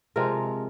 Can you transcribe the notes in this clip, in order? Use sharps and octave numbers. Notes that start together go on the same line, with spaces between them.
C3 F3 G#3 A#4